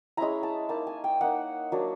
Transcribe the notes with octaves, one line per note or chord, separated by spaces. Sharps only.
G#3 C#4 E4 A#5
A5
A#3 D#4 A5
G#5
G5
A#3 D#4 F#5
F#3 A#3 D4